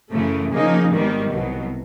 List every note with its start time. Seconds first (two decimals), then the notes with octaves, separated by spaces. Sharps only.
0.11 F#2 C#3 E3 A3
0.51 C#3 F3 A#3 D#4 G#4
0.91 G#1 G#2 D#3 G3 B3
1.30 C2 B2 F#3 B3